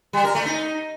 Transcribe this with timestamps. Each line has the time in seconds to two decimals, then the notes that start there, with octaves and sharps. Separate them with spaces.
0.13 G3
0.24 A#4
0.35 A3
0.46 D#4